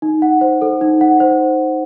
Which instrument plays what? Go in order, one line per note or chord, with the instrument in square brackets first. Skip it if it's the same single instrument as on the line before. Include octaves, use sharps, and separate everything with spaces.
[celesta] D#4
F#5
C5
A4
D#4
F#5
C5